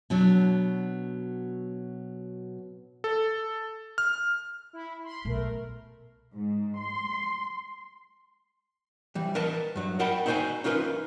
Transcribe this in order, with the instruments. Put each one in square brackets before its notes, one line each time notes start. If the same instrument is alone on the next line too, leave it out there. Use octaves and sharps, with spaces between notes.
[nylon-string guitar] B2 F#3 D4
[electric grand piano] A4
F6
[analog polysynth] E4
B5 C6
[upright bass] B1 [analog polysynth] A3 A#4
[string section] G#2
C6
[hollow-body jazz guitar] E3 G3
A#4 B4 D#5 A5
G2 F#3
A#4 D#5 F#5 G5 A5 B5
D#4 E4 F#4 C5 G5 G#5
C#4 D#4 F4 A#4 B4